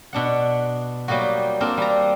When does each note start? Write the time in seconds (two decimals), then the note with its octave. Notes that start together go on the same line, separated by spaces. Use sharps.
0.13 B2 D4 F#5
1.08 F#3 G3 A#3 D#4 F#4
1.60 A#3 C4 D4 A#4
1.77 G3 A#5